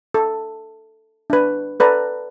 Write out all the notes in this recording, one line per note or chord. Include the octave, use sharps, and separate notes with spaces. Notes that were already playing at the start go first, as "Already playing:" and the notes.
A4
D4 B4
A4 B4 D5 A#5